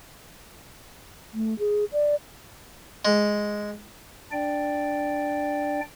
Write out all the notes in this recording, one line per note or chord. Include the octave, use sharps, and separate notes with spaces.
A3
G#4
D5
G#3
D4 D5 G5